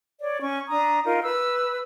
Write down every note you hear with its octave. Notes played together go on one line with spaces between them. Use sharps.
C#5 D5
C#4 C#6
D4 A#5 D#6
D#4 F4 A#4
B4 E6